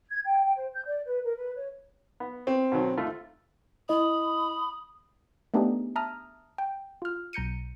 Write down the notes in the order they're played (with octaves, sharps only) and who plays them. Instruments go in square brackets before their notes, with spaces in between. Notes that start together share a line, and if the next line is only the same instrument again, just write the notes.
[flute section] G#6
G5
G5
C5
G6
D5
B4
A#4
B4
C#5
[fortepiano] B3
[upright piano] C4
[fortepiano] B2 D#3 F#3
D#2 A3 F4
[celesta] E4 D#5 [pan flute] B5 [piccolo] D#6
[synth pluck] A3 B3 D4 D#4 G4 G#4
E5 A5 A#5 D#6 F6
G5
F4 F6
B1 A#5 G6 C#7 D#7